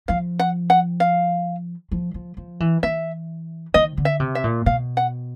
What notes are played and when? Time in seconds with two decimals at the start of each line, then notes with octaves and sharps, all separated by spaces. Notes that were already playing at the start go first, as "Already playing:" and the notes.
0.08 F3 F5
0.39 F#5
0.70 F#5
1.00 F5
1.92 F3
2.14 F3
2.37 F3
2.60 E3
2.83 E3 E5
3.74 D#3 D#5
3.97 D3
4.05 E5
4.20 C3
4.35 E5
4.44 A#2
4.66 B2 F5
4.97 F#5